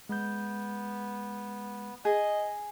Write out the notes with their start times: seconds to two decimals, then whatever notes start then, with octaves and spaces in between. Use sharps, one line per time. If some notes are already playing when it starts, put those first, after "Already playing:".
0.09 G#3 B3 G6
2.05 G#4 D#5